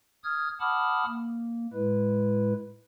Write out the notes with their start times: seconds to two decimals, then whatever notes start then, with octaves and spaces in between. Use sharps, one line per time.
0.24 D#6 F6 G#6
0.60 F#5 A5 B5 D6 D#6 F6
1.06 A#3
1.73 A2 G#3 E4 B4